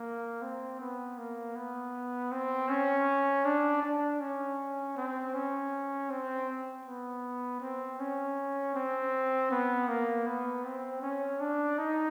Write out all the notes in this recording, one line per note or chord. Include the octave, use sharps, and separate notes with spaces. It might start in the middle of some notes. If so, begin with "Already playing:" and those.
Already playing: A#3
C4
B3
A#3
B3
C4
C#4
D4
D4
C#4
C4
C#4
C4
B3
C4
C#4
C4
B3
A#3
B3
C4
C#4
D4
D#4